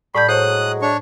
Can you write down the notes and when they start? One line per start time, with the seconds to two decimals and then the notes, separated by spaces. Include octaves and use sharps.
0.15 A2 G3 A5 B5 G6
0.29 A2 F#3 G#3 C5 C#5 D#6 F#6
0.82 D4 C#5 C#6